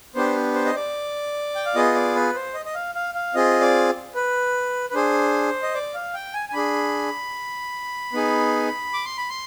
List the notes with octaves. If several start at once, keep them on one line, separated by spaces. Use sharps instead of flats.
B3 D4 G4 C5
C5
D#5
D5
G5
F5
B3 F4 G#4 D#5
D5
B4
C5
D#5
D#5
F5
F5
F5
C4 F4 G#4 D#5
D5
B4
B4
D4 G#4 C5
D#5
D5
F5
G5
G#5
G#5
D4 G#4 B5
B3 D#4 G#4
D6
C6
B5
C6